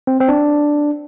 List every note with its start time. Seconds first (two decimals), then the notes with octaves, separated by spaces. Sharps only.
0.07 C4
0.21 C4
0.29 D4